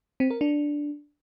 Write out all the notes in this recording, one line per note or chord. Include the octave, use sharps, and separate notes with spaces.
C4
A#4
D4